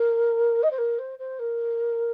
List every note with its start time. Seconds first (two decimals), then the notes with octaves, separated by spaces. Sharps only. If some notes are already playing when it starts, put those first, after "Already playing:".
Already playing: A#4
0.63 D#5
0.71 C5
0.78 A#4
0.99 C5
1.19 C5
1.39 A#4